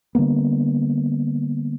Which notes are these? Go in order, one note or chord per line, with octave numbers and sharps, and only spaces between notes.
D3 G3 A#3 B3